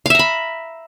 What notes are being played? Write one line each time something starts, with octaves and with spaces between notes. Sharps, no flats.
E5 F5 A#5 B5